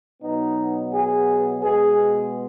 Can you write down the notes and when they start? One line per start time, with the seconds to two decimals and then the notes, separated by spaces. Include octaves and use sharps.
0.22 B2 F#3 B3 D#4
0.93 G#4
1.63 B2 G#3 B3 G#4